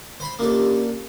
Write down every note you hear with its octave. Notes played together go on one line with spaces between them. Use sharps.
C5 B5 C6
A#3 C#4 D4 F4 G4 A4